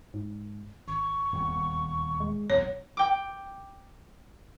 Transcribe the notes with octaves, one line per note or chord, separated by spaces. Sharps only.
G#2
G#1 C#6
D#1 E2
G#3
B1 E2 A#2 C#5
G5 D6